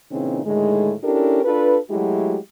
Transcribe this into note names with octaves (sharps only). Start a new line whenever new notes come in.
A#2 C#3 E3 C4 C#4 D#4
A2 D3 D#3 G#3
C#4 D4 E4 G4 A4 A#4
D4 F4 A4 B4
F#3 G#3 A3 E4 F#4 G4